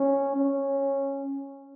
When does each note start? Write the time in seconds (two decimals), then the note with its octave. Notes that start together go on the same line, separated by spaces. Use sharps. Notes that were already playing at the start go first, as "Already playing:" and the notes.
Already playing: C#4
0.36 C#4